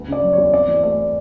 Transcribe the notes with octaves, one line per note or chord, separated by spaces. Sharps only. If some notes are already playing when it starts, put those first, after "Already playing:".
Already playing: D2 B3
C#3 D5
F#3
C#5
E2
C4 D5
E3
A3 D5